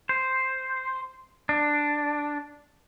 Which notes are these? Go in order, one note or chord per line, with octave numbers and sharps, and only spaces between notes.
C5
D4